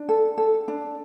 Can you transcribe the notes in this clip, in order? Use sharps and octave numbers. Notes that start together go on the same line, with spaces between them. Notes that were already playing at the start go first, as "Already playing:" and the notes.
Already playing: D4
A4
A4
D4